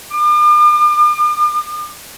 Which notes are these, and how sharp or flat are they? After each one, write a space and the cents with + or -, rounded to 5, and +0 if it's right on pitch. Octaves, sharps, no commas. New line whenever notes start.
D6 +45